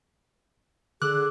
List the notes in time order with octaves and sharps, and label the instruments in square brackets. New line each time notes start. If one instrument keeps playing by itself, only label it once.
[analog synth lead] D3 [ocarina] G#4 [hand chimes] D6 E6 [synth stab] F#6